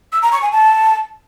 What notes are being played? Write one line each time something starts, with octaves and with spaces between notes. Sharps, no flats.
E6
A#5
C#6
G#5
A5